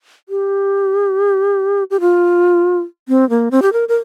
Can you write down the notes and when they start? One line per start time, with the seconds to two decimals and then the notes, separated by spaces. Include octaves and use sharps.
0.29 G4
1.91 G4
2.00 F4
3.08 C4
3.30 A#3
3.51 C4
3.62 G4
3.73 A#4
3.89 A#4